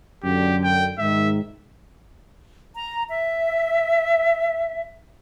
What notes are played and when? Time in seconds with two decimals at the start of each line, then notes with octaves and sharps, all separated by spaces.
0.24 F#2 D3 G4
0.64 G5
0.98 G#2 D#3 E5
2.75 A#5
3.09 E5